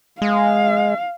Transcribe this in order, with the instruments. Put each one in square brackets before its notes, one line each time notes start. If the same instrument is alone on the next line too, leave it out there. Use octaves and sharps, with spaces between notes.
[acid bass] G#3 [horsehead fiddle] F5